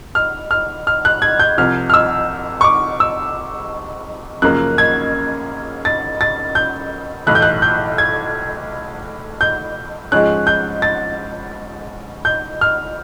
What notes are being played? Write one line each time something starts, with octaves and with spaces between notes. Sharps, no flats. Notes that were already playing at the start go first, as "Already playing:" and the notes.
F6
F6
F6
F#6
G#6
G6
C2 C3 F3 F6
F6
E6
C#6
D6
E6
F#2 C#3 F3 A#3 F#6
G#6
A6
A6
G6
B1 A2 E3 F#6
G6
F#6
G6
G#6
G6
G#2 F3 G#3 C#4 F#6
G6
A6
G6
F6